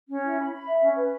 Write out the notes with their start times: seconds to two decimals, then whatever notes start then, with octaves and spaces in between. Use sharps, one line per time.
0.09 C#4
0.23 E4
0.39 B5
0.53 B5
0.68 E5
0.82 C#4
0.97 B4